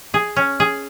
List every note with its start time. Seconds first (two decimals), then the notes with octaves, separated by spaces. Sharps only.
0.14 G#4
0.36 C#4
0.60 G#4